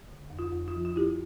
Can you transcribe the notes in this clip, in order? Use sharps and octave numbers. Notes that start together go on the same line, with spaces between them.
D3
F2
F4
F2
F4
F3
F4
F3 E4 G4